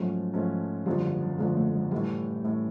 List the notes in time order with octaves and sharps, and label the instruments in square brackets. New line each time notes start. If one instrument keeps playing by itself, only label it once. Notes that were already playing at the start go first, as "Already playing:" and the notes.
Already playing: [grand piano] G#2 F3 A3 C#4 [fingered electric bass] F#3
[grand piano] G#2 F3 A3 C#4
[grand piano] F#1 F#2 D3 F3 [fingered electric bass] G3
[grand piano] F#1 F#2 D3 F3 [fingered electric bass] G#3
[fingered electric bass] A3
G#3
[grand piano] A2 E3 A3 [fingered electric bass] G3
[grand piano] A2 E3 A3